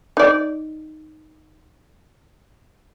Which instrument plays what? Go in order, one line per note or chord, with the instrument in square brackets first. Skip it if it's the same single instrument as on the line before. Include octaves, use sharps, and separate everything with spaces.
[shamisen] D#4 D5